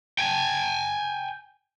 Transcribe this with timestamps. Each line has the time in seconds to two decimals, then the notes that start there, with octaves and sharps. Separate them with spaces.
0.19 G5 G#5